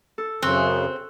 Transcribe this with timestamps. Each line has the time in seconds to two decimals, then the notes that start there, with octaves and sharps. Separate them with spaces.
0.18 A4
0.42 F#2 C#3 C4 C#6 F#6